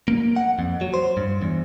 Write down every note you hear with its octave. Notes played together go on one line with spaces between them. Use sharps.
A#3
F#5
F2
F#3
C5
G2
E2